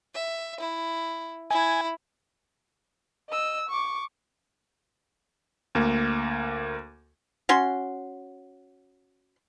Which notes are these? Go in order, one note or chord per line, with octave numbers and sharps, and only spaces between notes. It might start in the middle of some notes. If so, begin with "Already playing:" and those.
E5
E4
E4 G#5
D#5 E6
C#6 D6
D2 A#3
C#4 F#4 C6